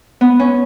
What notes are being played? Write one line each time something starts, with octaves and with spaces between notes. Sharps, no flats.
B3
C#4